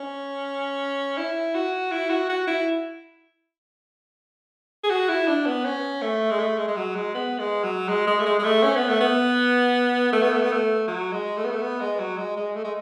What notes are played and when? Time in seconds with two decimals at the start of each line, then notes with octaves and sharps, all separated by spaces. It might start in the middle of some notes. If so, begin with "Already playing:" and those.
Already playing: C#4
1.18 E4
1.55 F#4
1.91 E4
2.10 F#4
2.29 F#4
2.47 E4
4.84 G#4
4.90 F#4
5.09 E4
5.28 D4
5.46 B3
5.65 C#4
6.02 A3
6.31 G#3
6.39 A3
6.58 G#3
6.68 G#3
6.77 F#3
6.95 G#3
7.14 B3
7.39 G#3
7.64 F#3
7.88 G#3
8.07 G#3
8.20 A3
8.26 G#3
8.39 G#3
8.44 A3
8.63 C#4
8.76 B3
8.89 A3
9.01 B3
10.13 A3
10.22 B3
10.33 A3
10.42 B3
10.53 A3
10.88 F#3
11.12 G#3
11.37 A3
11.44 B3
11.52 A3
11.62 B3
11.80 G#3
12.00 F#3
12.17 G#3
12.36 G#3
12.55 A3
12.64 G#3